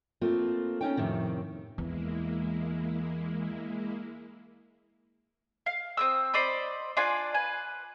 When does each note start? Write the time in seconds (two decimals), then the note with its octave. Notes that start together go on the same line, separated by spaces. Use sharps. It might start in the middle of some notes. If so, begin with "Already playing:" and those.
0.21 A3 A#3 C4 F4
0.81 B3 C#4 D#4 G5
0.97 F2 A2 C3 D#3
1.78 E2 G#3 A#3 E4
5.66 F5
5.97 C4 D#6 E6
6.34 C5 D5 D#5 B5
6.97 D4 F4 D5 G#5
7.34 B4 G#5